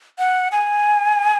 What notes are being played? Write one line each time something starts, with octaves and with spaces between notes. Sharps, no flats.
F#5
G#5